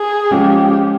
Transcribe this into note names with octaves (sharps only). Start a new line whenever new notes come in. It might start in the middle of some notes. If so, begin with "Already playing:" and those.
Already playing: G#4
F3 G#3 C#4 F4 G4